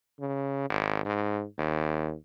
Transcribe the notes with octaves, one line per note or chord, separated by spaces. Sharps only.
C#3
G#1
G#2
D#2